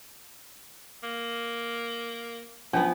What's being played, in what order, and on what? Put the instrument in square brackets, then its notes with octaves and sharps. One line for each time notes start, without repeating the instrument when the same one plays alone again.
[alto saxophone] A#3
[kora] F3 B3 [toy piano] C#4 D4